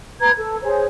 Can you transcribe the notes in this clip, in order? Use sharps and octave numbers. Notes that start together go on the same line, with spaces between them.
B4 A#5 G#6
A4
G#4 C5 C#5